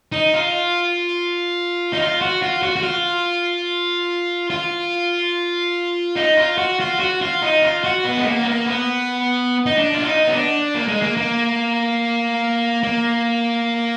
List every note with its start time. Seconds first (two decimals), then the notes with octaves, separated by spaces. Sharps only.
0.12 D#4
0.34 F4
1.93 D#4
2.00 F4
2.21 F#4
2.42 F4
2.63 F#4
2.76 F#4
2.83 F4
4.50 F4
6.16 D#4
6.37 F4
6.58 F#4
6.80 F4
7.00 F#4
7.21 F4
7.42 D#4
7.62 F4
7.84 F#4
8.04 B3
8.17 G#3
8.25 A#3
8.41 B3
8.46 A#3
8.66 B3
9.66 D#4
9.78 D4
9.94 F4
10.06 D#4
10.27 B3
10.33 D4
10.74 A#3
10.88 G#3
11.02 A#3
11.17 A#3
12.83 A#3